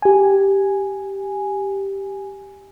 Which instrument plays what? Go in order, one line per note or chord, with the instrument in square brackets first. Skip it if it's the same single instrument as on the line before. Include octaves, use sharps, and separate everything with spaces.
[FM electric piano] G4 G#5